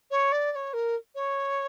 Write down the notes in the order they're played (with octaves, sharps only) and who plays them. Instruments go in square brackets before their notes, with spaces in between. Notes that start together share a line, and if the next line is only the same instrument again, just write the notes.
[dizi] C#5
D5
D5
C#5
A#4
C#5